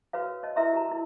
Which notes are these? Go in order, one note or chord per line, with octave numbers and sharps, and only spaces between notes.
F#4 B4 C#5 F5
A#4
C#5 D#5 A5
E4 A#4 B4 E5 A#5 C6
F#4 G4 A5 A#5
E4 A#4